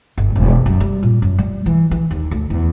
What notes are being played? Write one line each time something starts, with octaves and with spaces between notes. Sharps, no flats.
G1
E1
F#2
G3
A#2
F#2
G3
E3
E3
D#2
D2
E2